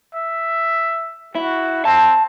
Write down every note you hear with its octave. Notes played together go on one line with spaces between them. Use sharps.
E5
E4 F#4
C4 A5